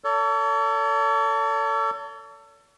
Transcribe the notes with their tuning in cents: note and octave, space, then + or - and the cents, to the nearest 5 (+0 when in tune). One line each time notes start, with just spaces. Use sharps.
A4 +25 C#5 +45